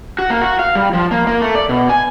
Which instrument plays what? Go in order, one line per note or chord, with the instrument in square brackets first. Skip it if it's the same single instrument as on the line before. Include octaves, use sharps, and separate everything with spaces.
[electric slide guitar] F#4
A#3
F#4
F5
G3
F3
A#3
A#3
A3
D5
B2
G#5